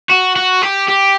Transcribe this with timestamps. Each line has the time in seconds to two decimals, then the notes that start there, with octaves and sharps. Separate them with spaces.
0.10 F#4
0.36 F#4
0.62 G4
0.88 G4